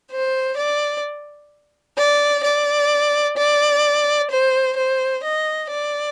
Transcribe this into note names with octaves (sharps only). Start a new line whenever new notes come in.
C5
D5
D5
D5
D5
C5
C5
D#5
D5